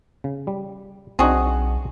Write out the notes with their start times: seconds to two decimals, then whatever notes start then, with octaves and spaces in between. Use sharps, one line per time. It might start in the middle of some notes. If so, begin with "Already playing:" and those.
0.24 C#3
0.47 G3
1.19 B1 C4 D4 D#4 F#4 G#4